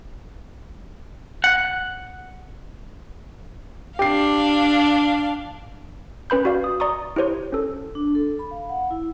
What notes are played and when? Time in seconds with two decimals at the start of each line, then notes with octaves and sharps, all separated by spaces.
1.44 F#5
3.99 D4 G4 F5 C7
6.30 C#4 B4 B5 G6
6.45 F#4 D5 F5
6.64 D#6
6.80 D5 A#5 C#6 D#6
7.16 E4 G4 C5 C#5
7.52 C#4 A4
7.95 D4
8.15 A4
8.39 B5
8.51 F5
8.69 F#5
8.91 E4